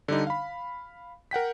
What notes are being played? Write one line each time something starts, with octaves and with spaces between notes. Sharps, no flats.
D3 G3 D#4
F5 B5
A#4 F#5 G5 B6